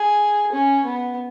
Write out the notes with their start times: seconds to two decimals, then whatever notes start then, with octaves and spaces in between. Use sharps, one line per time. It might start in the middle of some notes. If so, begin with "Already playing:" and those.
Already playing: G#4
0.52 C#4
0.85 B3